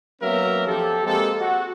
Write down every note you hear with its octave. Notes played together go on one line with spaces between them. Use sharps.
F#3 A#3 B3 C#4 A#4 E5
F3 G4 A4
G#3 A#3 C4 G4 A4
F#4